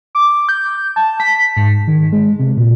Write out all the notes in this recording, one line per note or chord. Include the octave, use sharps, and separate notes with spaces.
D6
G6
A5
B6
G#2
D#3
G#3
C3
A#2